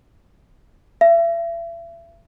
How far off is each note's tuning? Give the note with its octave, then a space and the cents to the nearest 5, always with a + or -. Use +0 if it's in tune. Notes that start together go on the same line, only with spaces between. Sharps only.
E5 +40